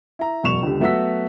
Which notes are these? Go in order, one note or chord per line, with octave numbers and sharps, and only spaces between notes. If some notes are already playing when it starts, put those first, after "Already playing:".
E4 A#5
E1 F#2 C#6 E7 F7
C#2 D3 G4
F#3 A3 B3 F#4 E6 B6